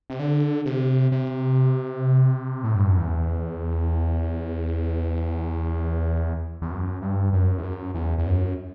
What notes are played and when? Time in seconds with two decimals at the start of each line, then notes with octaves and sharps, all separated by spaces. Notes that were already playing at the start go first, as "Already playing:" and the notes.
0.10 C3
0.19 D3
0.66 C3
1.12 C3
2.64 A2
2.75 G2
2.88 F#2
2.98 E2
6.62 E2
6.71 F#2
7.02 G2
7.33 F#2
7.58 E2
7.63 F#2
7.94 E2
8.18 E2
8.26 F#2